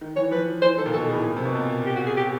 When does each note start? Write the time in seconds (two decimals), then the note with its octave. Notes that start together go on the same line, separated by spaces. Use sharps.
0.01 D#3
0.16 E3 C#5
0.31 F3 B4
0.62 E3 C5
0.78 D#3 A4
0.86 A#2
0.93 B2 A4
1.09 A2 G#4
1.24 A#2
1.36 C3
1.45 B2
1.55 A#2
1.86 G4
1.96 F#4
2.07 G#4
2.17 G4